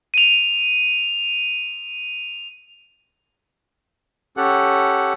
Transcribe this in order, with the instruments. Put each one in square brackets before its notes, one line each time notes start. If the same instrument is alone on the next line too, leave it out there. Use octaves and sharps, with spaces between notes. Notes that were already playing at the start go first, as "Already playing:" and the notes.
[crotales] D#7 F7
[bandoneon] C#4 G4 A4 F#5